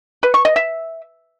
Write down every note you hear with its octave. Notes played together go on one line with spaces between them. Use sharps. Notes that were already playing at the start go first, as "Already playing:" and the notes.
B4
C#6
D#5
E5